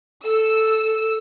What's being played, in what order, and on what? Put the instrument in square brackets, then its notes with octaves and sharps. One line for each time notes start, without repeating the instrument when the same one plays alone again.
[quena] A4 [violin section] E6